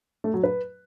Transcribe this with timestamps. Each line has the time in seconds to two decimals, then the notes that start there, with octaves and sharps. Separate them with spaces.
0.24 A3
0.34 F#3
0.44 B4